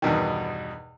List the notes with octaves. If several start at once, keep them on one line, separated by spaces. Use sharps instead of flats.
E2 G2 B2 D#3